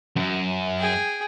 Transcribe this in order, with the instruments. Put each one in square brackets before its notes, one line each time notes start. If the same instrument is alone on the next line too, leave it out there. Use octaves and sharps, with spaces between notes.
[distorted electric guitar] F#2
[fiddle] G#4 G5